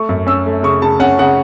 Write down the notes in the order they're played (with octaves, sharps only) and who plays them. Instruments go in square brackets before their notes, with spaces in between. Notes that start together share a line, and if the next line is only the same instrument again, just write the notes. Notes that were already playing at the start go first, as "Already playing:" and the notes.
Already playing: [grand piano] A3 C#6
F#2
C#4 E6
A3
C#3 C#6
C#3 A5
C#4 F#5
C#3 F#5